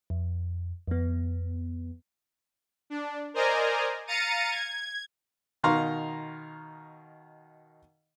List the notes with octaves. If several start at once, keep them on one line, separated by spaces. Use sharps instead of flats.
F2
F2 B3
D4
A#4 C5 D5 D#5 G#5 A#5
F5 A#5 A6 C#7 D#7
G#6
B2 D#3 F5 A#5 C6 C#6